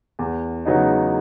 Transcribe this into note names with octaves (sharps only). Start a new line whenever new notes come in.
E2
C#3 F#3 B3 D#4